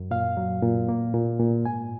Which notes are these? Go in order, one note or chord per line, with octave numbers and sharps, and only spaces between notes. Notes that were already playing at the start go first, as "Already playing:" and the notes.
Already playing: F#2
A#2 F5
F#3
A#2
A#3
A#2
A#2
G#2 G#5